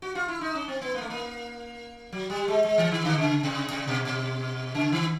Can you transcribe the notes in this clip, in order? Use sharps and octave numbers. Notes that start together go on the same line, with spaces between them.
F#4
F4
E4
D#4
C#4
C4
B3
A#3
A3
A#3
F#3
G3
G#3
G#3
E3
D#3
D3
C#3
C3
C3
B2
B2
C#3
D#3